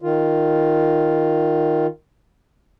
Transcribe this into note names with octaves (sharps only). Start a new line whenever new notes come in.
D#3 F4